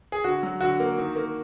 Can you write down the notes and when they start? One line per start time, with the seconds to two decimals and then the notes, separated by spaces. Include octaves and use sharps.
0.12 G#4
0.24 D3 F#4
0.43 F#3
0.61 D3 F#4
0.80 A#3
0.98 D#3
1.16 A#3